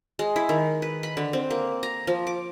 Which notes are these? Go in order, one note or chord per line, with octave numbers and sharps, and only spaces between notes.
G#3
E4
D#3
B4
B5
D3
C4
A#3
A#5
F3
D6